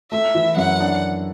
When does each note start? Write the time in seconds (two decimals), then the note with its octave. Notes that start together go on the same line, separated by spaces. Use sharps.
0.11 A3 E5
0.35 E3
0.56 F#2 F#5
0.80 D4